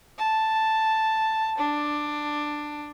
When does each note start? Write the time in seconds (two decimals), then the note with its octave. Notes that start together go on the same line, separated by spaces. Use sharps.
0.18 A5
1.58 D4